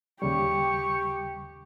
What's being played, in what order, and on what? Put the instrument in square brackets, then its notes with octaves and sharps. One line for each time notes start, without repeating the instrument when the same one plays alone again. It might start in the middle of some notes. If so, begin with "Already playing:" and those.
[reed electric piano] D#2 C#3 G3 [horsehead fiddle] G4 [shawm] C#6